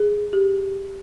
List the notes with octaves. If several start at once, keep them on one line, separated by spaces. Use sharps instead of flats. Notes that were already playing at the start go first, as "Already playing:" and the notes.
Already playing: G#4
G4